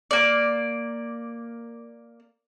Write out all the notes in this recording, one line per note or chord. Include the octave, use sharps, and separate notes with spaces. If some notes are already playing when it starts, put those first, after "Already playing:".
A#3 D5